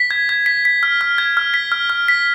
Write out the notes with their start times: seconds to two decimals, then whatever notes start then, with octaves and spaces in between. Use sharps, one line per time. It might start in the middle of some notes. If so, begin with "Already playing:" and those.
Already playing: B6
0.11 G#6
0.29 G#6
0.46 B6
0.65 B6
0.83 F6
1.01 F6
1.18 G#6
1.37 F6
1.54 B6
1.72 F6
1.90 F6
2.08 B6